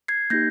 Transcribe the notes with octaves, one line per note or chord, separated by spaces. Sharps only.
G#6 C7
A#3 D#4 G4 G6 A#6